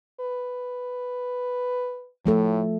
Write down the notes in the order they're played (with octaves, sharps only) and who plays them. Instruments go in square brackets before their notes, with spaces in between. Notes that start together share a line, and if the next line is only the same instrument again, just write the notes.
[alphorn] B4
[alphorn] A2 [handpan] F3 A3 A4